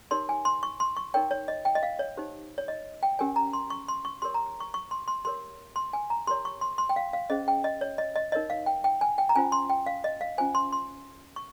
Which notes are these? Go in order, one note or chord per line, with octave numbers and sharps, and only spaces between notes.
D#4 G4 A#4 C#5 C6
G#5
C6
C#6
C6
C#6
D#4 A#4 C#5 G5
C#5
D#5
G5
D#5
F5
C#5
D#4 G4 C5
C#5
D#5
G5
C#4 G4 A#4 C#5 G#5
A#5
C6
C#6
C6
C#6
G4 A#4 C#5 C6
A#5
C#6
C#6
C6
C6
G4 A#4 C#5 C6
C6
G#5
A#5
G4 A#4 C#5 C6
C#6
C6
C6
G5
F5
F5
C#4 G#4 C5 D#5
G5
D#5
C#5
D#5
D#5
D#4 A#4 C#5 D#5
F5
G5
G5
G#5
G5
A#5
C#4 F4 C5 G#5
C6
G5
F5
D#5
F5
C#4 F4 C5 G#5
C6
C6
C#6